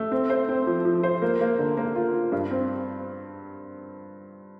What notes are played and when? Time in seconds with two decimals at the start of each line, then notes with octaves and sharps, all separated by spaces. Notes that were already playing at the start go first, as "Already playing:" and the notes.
Already playing: A3
0.12 C4
0.30 C5
0.49 C4
0.67 F3
0.85 F3
1.03 C5
1.22 A#3
1.41 A#3
1.59 D3
1.77 A#3
1.95 F4
2.14 F4
2.32 G2
2.51 C4